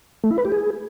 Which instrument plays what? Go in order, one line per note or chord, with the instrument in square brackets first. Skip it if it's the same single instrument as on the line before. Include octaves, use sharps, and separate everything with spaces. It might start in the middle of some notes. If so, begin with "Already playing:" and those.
[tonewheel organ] A3
E4
B4
G4
G#4